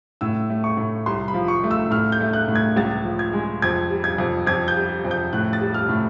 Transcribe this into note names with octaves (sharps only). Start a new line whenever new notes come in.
A2 E6
A3
C#6
A2
C2 C6
B5
F3
C#6
A3
E6
A2 F6
G6
A3
F#6
A2
G#6
C#2 A6
F3
G#6
G#3
F2 G#6
G3
G#6
F2
F2 G#6
G6
G3
F2
G6
A2 F#6
A6
G3
F6
A2